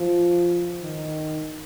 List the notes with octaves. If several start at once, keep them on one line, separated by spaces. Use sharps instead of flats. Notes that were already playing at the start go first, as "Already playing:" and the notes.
Already playing: F3
D#3